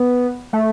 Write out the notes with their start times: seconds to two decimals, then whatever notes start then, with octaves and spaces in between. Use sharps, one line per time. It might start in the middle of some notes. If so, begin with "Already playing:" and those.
Already playing: B3
0.53 A3